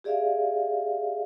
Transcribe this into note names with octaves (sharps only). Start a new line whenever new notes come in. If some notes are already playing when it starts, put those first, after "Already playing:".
G4 G#4 D5 E5 F5